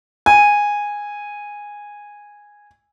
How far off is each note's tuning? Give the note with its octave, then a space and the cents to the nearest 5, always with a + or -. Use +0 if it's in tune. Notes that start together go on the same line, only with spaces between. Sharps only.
G#5 -10